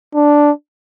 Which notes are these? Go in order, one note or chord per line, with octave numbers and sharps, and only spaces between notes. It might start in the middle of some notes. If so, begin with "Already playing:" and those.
D4